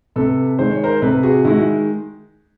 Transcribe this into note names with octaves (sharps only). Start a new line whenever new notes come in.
C3 A4 B4
D#3 G#3 C5
C#5
A#4 C5
C3 A4 B4
F#4 G#4
D#3 G#3 E4 F#4